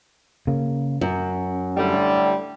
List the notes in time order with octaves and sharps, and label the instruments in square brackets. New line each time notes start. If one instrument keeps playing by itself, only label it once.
[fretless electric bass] C#3 A#3
[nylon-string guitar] F#2 [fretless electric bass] C#4
[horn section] A2 D3 G3